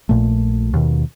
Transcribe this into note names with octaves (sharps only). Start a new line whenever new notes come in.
A#1 A#2 A3
D#2 B2 D#3